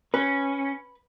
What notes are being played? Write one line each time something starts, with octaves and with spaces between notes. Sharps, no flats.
C#4 B4